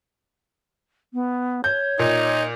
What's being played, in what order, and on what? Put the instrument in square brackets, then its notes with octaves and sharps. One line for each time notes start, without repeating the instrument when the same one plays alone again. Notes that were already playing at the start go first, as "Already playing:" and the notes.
[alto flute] B3
[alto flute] C#5 [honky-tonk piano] G6
[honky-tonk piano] A#2 [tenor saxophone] D#4